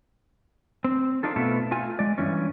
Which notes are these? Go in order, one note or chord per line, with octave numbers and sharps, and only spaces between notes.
C4
D4 D#4 F4 A4
B2 A3 B3 E4 F4 A4
A3 F4 G#5
G#3 D5
G2 B2 E3 C#4